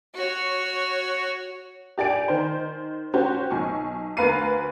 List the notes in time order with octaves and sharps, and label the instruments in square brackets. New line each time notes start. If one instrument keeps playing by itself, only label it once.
[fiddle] F#4 C#5
[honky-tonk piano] G4 D5 G#5 D7
D#3 C5
C#4 F#4 G4 C5
B1 G#5 C#6
D2 A#4 B4 F5 C7 D#7